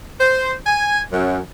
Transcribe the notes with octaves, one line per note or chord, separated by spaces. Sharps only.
C5
G#5
F#2